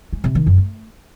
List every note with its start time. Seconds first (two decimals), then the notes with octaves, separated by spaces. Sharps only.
0.13 G#3
0.24 C3
0.35 D#3
0.46 F#2
0.58 A3